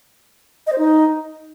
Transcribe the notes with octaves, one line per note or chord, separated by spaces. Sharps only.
D#5
C5
D#4